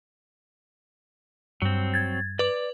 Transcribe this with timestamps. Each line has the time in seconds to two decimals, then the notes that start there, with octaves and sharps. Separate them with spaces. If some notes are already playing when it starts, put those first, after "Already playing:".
1.62 G2 F#3 C4
1.94 G#6 A6
2.39 B4 D5 D6